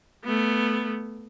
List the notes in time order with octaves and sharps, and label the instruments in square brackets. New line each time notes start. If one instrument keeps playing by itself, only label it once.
[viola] A3 B3